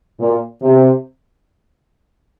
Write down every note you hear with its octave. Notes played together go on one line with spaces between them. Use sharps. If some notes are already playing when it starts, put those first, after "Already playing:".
A#2
C3